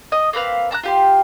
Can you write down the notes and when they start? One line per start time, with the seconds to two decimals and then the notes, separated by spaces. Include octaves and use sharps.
0.12 D#5 D#6
0.33 A#3 C4 B4 F5
0.71 A5 A#5 D6 F#6
0.83 F4 G4 C6